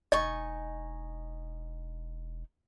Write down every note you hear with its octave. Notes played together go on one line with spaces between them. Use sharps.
E1 D#4 D#5 G#5 C#6